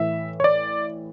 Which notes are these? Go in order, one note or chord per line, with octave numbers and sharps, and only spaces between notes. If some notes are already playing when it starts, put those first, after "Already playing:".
Already playing: A2 E3 E5
C#5
D5